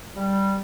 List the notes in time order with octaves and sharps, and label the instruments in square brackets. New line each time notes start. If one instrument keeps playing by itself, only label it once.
[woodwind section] G3